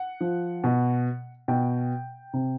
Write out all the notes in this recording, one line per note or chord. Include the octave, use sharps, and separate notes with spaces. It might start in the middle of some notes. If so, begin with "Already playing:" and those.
Already playing: F#5
F3
B2
B2 G5
C3